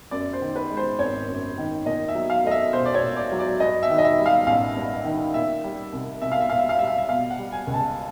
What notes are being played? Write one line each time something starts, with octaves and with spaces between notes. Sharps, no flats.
F#2 D5
C5
D#3
B4
G#3
C5
G#1 C#5
F#2
D#3
A#2 D#5
E5
F#3
F5
A3 D#5
E5
B1 C5
D5
C#5
A#2
D5
F#3
D5
G2 D#5
E5
D#3
D#5
E5
G3
F5
A1 F5
G2
D#3
A#2 E5
G3
C2
C2 E5
F5
E5
A#2 F5
E5
F5
G3 E5
F5
E5
B2 F5
F#5
G3
G#5
C#2
A5